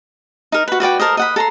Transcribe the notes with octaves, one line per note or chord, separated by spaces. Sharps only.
D#4 A#4
F#4 B4
F#4 B4 D5 G5
A4 A#4 C5 D#5
D#5 F#5 B5
A4 A#5 C6